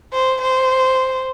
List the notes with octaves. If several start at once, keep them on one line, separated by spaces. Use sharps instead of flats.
C5
C5